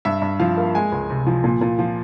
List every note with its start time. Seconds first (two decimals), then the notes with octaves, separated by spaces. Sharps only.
0.05 G2 E5
0.22 G2
0.39 F3 F5
0.57 A#3
0.75 G#3 G#5
0.92 C#2
1.10 C3
1.27 F3
1.44 A#2
1.61 A#2
1.79 F3